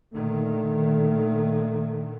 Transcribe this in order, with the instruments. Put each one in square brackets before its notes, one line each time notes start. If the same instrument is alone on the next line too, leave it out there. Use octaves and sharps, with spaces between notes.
[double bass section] A#2 D3 D#3 [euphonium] A3